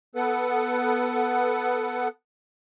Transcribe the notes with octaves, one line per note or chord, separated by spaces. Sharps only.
B3 A4 B4 F#5